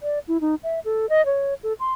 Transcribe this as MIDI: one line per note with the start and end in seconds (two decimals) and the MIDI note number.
0.01 0.19 74
0.28 0.40 64
0.41 0.55 63
0.63 0.80 76
0.85 1.09 69
1.09 1.24 75
1.26 1.54 73
1.63 1.73 69
1.79 1.94 84